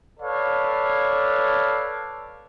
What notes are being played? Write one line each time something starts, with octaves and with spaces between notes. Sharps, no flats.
A4 B4 C#5 D5 F5